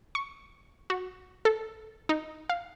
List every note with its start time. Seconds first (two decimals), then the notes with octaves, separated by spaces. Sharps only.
0.15 C#6
0.90 F#4
1.45 A4
2.09 D#4
2.49 F5